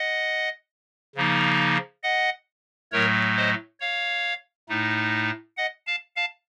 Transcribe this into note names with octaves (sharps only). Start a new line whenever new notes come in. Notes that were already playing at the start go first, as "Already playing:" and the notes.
Already playing: D#5 F#5
C#3 F3 A#3 D#4
D#5 F#5
A2 F#3 A3 A#4 C#5
C5 D#5
C#5 F5
A2 A3 D#4
D#5 F#5
F5 A5
F5 A5